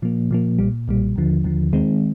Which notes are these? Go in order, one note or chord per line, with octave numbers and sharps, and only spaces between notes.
A#2 F3 A#3
A#2 F3 A#3
B1 A#2 G3
B1 A#2 G3
D#2 D3 F3
D#2 D3 F3
D#2 D#3 G#3 C4